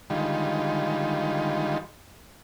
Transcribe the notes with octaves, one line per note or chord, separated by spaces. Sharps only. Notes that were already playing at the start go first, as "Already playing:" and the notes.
D3 D#3 G3 G#3 D#4 F4